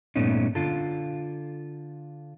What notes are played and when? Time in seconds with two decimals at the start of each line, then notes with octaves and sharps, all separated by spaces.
0.16 G2 A#2 A3 B3 C#4 D#4
0.55 D3 F4 A4